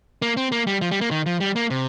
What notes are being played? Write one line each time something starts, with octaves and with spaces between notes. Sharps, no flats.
A#3
C4
A#3
G3
F3
G3
A#3
D#3
F3
G3
A#3
C3